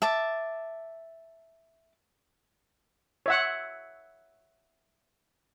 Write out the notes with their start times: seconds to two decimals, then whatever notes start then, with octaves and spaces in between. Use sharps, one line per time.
0.02 E5 A5 D6
3.26 C#5 E5 F#5